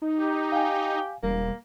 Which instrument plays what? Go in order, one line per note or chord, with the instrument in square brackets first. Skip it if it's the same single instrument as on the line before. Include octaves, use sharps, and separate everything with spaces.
[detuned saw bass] D#4
[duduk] G4
[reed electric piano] F5 G#5 [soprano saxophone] G5
[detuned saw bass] E1 [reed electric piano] G3 [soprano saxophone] A#3